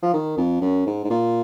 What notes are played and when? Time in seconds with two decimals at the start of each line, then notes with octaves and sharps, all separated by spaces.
0.03 F3
0.14 D#3
0.37 F2
0.61 F#2
0.86 G#2
1.04 G#2
1.10 A#2